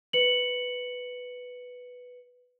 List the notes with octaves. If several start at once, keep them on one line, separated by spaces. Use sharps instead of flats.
B4 C#7 F#7